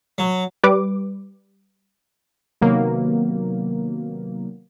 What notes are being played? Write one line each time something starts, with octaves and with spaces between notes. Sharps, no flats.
F#3
G3 B4 D6
C3 D#3 F#3 A#3 B3